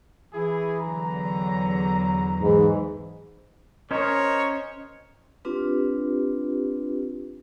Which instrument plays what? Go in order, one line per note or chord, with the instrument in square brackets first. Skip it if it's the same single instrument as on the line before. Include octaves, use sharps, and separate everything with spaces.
[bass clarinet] E3 [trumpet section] E4 G#4
[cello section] E2 D3 F#3 [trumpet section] A#5
[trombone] G#2 [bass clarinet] E3
[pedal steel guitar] C#4 C5 [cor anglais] A#4 [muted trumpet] C#5 [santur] D#5
[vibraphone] C4 D4 F4 G4 B4